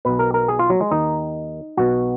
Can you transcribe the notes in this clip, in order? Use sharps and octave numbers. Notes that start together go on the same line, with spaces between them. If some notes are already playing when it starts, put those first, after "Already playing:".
B1 B2 B4
A#4
A#4
G#4
F4
F#3
G#3
D#2 D#3 D#4
B1 B2 F#4